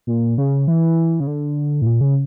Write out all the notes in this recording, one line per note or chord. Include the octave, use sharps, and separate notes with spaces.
A#2
C#3
E3
C#3
D3
A2
A#2
C#3